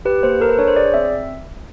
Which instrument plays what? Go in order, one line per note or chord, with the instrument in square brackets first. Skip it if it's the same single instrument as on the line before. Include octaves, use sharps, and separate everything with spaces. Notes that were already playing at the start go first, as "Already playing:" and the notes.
[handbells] G4 B4
A#3 C5
A4 A#4
B4
D4 C#5
C5
G#4 D5
C4 E5